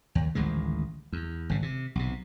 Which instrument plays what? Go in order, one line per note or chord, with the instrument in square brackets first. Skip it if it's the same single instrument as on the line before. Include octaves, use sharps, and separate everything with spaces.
[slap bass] D#2
A1 D2 D#3 G#3
E2
G#1 C#3
C3
B1 C3